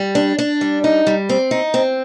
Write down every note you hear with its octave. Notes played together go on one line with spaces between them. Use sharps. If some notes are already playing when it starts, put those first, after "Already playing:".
Already playing: G3
D4
D4
G3
D#4
G3
C4
D#4
C4